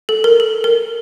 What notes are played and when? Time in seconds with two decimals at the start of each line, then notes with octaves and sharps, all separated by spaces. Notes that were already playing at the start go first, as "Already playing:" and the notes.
0.09 A4
0.24 A#4
0.40 A4
0.64 A#4